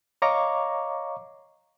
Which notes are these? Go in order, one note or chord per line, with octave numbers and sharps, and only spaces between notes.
C#5 D#5 F5 A#5 C#6 D6